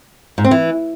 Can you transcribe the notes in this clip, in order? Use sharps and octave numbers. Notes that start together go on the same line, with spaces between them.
G#2
C4
E3